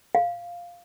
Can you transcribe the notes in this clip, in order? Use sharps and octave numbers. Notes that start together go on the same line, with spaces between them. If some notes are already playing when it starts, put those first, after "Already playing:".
F5